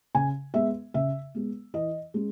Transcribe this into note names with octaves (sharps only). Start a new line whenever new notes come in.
C#3 G#5
G#3 B3 E5
C#3 E5
G#3 B3
E3 D#5
G#3 C#4